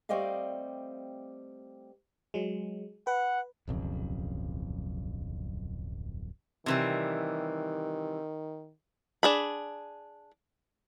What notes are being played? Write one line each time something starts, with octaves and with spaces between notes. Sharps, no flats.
G3 A3 C4 D5 D#5 F5
F#3 G#3
B4 F#5
D1 B1 F2 C#3
C3 D#3 E3 G3
D4 G#4 B5